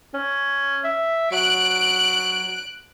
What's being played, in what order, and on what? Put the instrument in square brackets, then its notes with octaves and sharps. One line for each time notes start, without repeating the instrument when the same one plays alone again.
[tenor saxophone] C#4
E5
[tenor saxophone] F#3 [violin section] F#6 D7